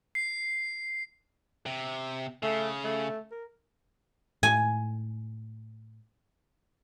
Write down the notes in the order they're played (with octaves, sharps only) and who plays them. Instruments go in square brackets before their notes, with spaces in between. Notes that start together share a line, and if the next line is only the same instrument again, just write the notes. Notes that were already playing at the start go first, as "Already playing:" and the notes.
[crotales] C7
[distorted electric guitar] C3
[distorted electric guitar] C#3 [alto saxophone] A3
[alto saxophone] A3
A#4
[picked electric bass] A2 [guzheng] G#5